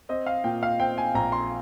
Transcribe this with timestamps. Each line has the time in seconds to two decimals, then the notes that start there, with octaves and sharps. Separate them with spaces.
0.09 C4 D#5
0.26 F5
0.44 A#2 G5
0.63 F5
0.79 C4 G5
0.98 G#5
1.15 A#1 A#5
1.32 C6